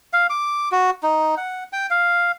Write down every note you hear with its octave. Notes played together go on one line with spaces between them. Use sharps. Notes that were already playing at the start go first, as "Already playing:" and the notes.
F5
D6
F#4
D#4
F#5
G5
F5